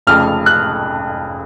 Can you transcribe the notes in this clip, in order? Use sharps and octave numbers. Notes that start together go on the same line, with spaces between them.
F1 F2 C#3 F6
F#6